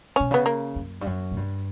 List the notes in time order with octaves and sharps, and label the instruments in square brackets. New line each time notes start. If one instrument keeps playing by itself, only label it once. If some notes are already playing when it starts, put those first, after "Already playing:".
[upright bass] B2 [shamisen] C#4
[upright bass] C#3 [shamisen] B3
[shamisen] A#3
[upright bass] F#2
G2
F#2
A#2
G2